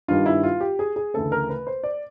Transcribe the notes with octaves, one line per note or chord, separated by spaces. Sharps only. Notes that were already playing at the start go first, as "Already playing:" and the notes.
G2 D#3 G3 F4
E4
F4
G4
G#4
G#4
D2 C#3 E3 A3 A4
A#4
B4
C5
D5